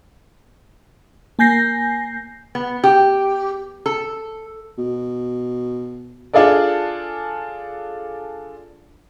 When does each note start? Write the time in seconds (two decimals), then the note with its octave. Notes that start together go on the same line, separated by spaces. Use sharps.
1.39 A#3 G#5 G6 A#6 C7
2.55 B3
2.84 G4
3.86 A4
4.78 B2
6.33 D4 F4 G#4 A4 D5